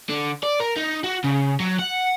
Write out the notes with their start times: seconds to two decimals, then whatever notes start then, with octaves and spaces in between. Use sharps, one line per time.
0.09 D3
0.43 D5
0.60 A#4
0.76 D#4
1.04 F#4
1.24 C#3
1.60 F#3
1.79 F#5